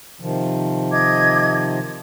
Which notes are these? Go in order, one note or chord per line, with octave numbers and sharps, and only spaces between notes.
C3 D#3 F3
D#5 D6 G#6